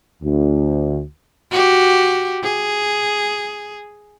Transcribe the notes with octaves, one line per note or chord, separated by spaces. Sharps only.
D2
F#4 G4
G#4